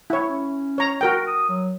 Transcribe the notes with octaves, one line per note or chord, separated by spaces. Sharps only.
E4 C#5
C#4
C#5 A#5
F#4 A#4 G5
D#6
F#3